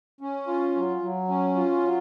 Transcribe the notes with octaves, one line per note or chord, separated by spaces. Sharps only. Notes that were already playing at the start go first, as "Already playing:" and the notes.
C#4
F4
F#3
F#3
C#4
F4
F#3